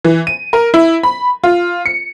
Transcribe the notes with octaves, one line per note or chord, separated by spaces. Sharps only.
E3
D#7
A#4
E4
B5
F4
C#7